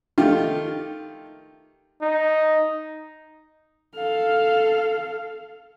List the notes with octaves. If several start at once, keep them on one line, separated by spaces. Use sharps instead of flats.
D#3 A3 F4 G4
D#4
A4 F5